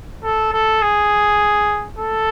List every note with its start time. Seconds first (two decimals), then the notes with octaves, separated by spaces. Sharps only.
0.23 A4
0.53 A4
0.82 G#4
1.98 A4